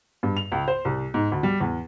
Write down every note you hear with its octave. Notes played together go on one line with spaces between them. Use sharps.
G2
F7
C#2
C5
C2
G#2
D2
G3
E2